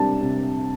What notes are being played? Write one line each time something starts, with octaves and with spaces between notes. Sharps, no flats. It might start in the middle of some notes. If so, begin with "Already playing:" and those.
Already playing: C3 G3 D4 A5
C3